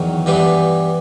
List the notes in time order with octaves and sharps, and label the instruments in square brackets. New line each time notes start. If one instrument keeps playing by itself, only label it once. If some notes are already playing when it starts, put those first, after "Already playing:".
Already playing: [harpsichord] E2 D#3 F#3
G2 E3 G3 B3